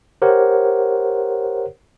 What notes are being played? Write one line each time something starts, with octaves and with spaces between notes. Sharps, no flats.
G4 A#4 C5 C#5 F#5